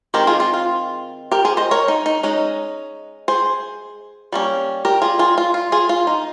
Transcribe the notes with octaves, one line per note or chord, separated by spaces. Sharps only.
D#3 G#3 C4 G4 A#4
F4 G#4
F4
F4
G4 A#4
G#4 C5
C5 D#5
A#4 C#5
D#4
D#4
G#3 C#4 D#4
G#4 C5
G3 A#3 C#4
G4 A#4
F4 G#4
F4 G#4
F4
F4
F4 G#4
F4
D#4